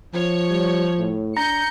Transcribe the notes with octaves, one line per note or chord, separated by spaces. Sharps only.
F3 C#5
G3
A2
D4 A#5 G6 A#6 C#7